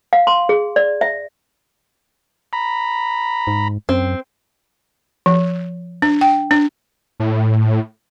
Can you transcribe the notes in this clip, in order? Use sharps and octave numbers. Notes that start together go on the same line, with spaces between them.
F5
C6
G#4
D5
E5
A#5 B5
G#2
F#2 C4
F3
D4
G5
D4
A2